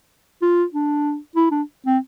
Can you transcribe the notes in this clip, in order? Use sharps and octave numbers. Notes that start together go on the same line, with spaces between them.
F4
D4
E4
D4
C4